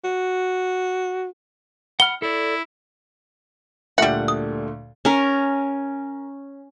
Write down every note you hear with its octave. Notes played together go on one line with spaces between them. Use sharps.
F#4
F#5 B5 F6 G7
E4 A4 D5
D2 A#2 G3 A3 E5 F#5 F#6 C#7
D#6
C#4 A#4